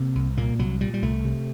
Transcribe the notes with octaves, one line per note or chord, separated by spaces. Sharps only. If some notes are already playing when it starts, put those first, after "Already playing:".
Already playing: C3 A#3
C2
A#2 A#3
C2 F#3
A#2 G3
G3
C2 A3
C3